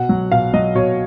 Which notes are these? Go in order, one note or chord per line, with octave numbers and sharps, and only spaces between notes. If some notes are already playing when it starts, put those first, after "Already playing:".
Already playing: B2 F#5
F#3
B2 F5
F#3 D#5
B2 C#5